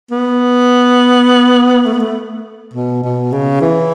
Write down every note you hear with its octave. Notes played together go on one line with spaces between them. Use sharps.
B3
A3
B3
A3
B2
B2
C#3
E3